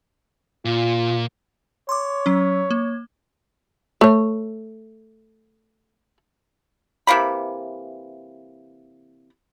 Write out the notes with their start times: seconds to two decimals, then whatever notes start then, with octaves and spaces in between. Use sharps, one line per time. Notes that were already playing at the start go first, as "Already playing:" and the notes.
0.65 A#2 F4
1.89 C#5 C6 D6
2.26 F#3 C#4
2.71 A#3
4.01 A3 C#5
7.07 C3 E3 A#3 B5